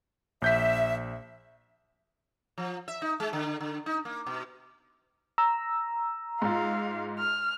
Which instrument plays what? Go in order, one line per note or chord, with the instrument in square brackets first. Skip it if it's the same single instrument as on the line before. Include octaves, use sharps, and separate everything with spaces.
[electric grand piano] A#1 G6 B6 [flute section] E5
[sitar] F3
E5
D#4
G#3
D3
D3
D#4
A#3
B2
[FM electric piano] A#5 E6
[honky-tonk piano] G#2 F4 [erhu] F5
[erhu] F6